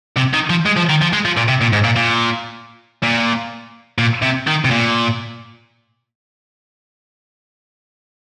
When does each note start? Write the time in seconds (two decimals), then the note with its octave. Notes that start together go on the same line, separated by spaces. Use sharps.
0.17 C3
0.34 D#3
0.50 F3
0.65 G#3
0.76 F3
0.89 D#3
1.01 F3
1.13 G#3
1.25 F3
1.37 A#2
1.48 C3
1.61 A#2
1.73 G#2
1.84 A#2
1.96 A#2
3.03 A#2
3.98 A#2
4.22 C3
4.47 D#3
4.65 C3
4.71 A#2